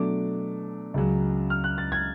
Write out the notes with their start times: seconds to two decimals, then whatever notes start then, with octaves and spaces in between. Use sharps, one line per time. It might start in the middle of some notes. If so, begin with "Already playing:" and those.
Already playing: B2 F#3 A3 D4 D6
0.94 C#2 C#3 F#3
1.50 F6
1.64 F#6
1.78 A6
1.92 G#6